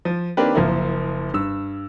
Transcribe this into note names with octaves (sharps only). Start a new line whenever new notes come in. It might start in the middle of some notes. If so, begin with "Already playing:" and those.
F3
D#3 A#3 C4 D4 G4 B4
F#1 F3 A#3 E4
G2 E6